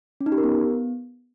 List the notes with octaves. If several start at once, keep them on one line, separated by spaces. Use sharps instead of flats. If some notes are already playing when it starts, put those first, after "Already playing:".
C#4
D#4
G4
A#4
B3